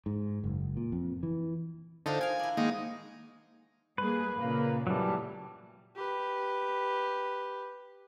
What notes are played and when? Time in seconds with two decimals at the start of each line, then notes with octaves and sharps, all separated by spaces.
0.06 G#2
0.44 F#1
0.77 A#2
0.92 F2
1.23 E3
2.06 D3 D#4 F4 A4 C5 F5
2.21 A#4 F5 G#5
2.39 D4 E4
2.57 D#3 G#3 A#3 D#4 F#4
3.98 G3 A#3 G#4 B4
4.36 A#2 C#3 A#3
4.87 A2 E3 F#3 G3 A5
5.96 G4 B4